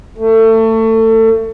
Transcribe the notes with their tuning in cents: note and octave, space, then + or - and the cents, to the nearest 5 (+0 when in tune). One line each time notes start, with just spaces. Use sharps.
A3 +25